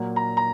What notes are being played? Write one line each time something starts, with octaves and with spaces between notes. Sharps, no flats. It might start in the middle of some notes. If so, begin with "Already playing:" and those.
Already playing: A#2 F#3 A#3
A#5
A#5